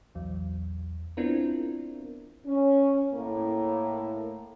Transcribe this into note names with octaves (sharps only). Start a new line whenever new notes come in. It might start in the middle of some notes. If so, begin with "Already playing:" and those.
A#1 E2 F#3
B3 C4 D4 E4 F4 A#4
C#4
A2 A#3